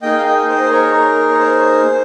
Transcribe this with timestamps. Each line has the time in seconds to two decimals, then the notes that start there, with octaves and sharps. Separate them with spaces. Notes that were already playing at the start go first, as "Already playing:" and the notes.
0.02 A#3 D#4 G#4 D#5 G5
0.18 F5
0.25 D#5 G5
0.48 C5 D#5
0.56 A#4
0.63 C5
0.71 A#4 C#5
0.93 A#4
1.30 C#5
1.39 C5